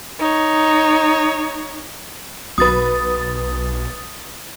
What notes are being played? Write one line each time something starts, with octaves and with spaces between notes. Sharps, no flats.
D#4 C#5
B1 F#3 B4 D#6 A6